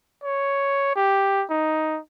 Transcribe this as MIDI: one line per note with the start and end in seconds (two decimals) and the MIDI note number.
0.24 0.94 73
0.96 1.45 67
1.50 2.00 63